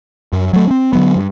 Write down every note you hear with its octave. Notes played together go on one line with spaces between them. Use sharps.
F#2
F#3 A3
C4 C#4
D3 F#3 B3
G2